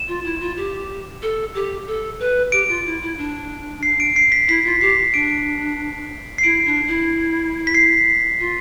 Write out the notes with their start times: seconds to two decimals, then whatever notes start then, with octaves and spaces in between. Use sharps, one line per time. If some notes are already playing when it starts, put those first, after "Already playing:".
Already playing: E7
0.08 F4
0.24 E4
0.40 F4
0.57 G4
1.22 A4
1.55 G4
1.87 A4
2.20 B4
2.52 G4 D7
2.69 F4
2.85 E4
3.02 E4
3.18 D4
3.83 C7
4.00 D7
4.16 C7
4.32 B6
4.48 E4 B6
4.65 F4
4.70 B6
4.81 G4 C7
5.14 D4 D7
6.38 C7
6.43 E4 D7
6.66 D4
6.88 E4
7.67 B6
7.74 C7
8.39 F4